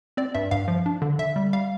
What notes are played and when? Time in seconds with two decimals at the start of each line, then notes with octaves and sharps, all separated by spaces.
0.17 C4 D5
0.35 G2 E5
0.51 G2 F5
0.68 F3
0.86 D4
1.02 D3
1.19 D3 E5
1.36 G3
1.53 G3 F5